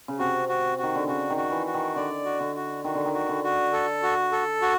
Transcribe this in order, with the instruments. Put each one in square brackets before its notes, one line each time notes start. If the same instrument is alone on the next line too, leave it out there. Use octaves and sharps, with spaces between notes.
[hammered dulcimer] C#3
[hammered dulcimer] C3 [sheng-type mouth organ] F#4
[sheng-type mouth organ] F#4
F#4
[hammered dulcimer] D#3
D3
[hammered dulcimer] C#3 [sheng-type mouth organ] F#4
[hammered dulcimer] D#3
[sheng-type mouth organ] F#4
[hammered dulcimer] E3
[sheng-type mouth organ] F#4
[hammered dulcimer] D#3
[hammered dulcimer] D3 [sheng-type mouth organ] D5
[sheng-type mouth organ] F#4
[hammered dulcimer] D3
[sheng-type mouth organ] F#4
[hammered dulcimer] D#3 [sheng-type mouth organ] F#4
[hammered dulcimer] D3
D#3
[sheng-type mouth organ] F#4
[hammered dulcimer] D3
[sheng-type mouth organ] F#4
A4
F#4
A4
F#4